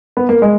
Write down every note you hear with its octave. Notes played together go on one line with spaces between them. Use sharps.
B3
A#3
G#3